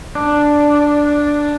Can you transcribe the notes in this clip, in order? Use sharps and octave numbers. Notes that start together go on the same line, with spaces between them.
D4